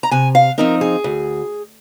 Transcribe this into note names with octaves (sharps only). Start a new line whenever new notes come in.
A#5
C3 G#5
F5
F3 C4 D#4 A#4
G#4
D2